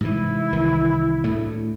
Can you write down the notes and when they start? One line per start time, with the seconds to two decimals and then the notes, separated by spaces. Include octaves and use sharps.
0.01 G#2 C3 E3 E4
0.53 C2 D#3 E3
1.24 D2 A2 A3